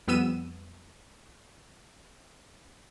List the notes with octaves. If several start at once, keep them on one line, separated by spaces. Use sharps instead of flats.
F2 G3 B3 E6 D#7 E7